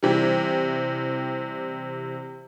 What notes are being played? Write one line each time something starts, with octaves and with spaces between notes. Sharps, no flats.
C3 E3 G3